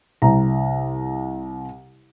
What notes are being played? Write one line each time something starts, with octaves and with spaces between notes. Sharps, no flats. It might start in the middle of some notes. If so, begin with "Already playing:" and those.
C2 A#5